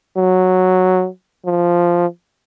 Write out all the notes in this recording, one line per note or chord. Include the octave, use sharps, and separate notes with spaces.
F#3
F3